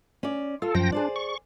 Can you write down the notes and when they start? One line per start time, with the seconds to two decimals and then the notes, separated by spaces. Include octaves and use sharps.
0.23 C#4 D5
0.62 F4 A4
0.75 F#2 F3 G5 A#6
0.92 D4 G#4 C5 D5
1.16 C#6